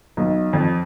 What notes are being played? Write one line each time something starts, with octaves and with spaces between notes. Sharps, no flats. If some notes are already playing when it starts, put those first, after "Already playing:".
B1
F2